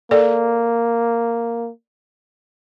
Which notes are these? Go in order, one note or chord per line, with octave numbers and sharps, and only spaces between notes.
A#3 A4 D5